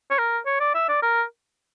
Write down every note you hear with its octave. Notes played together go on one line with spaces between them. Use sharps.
C#5
A#4
C#5
D5
E5
D5
A#4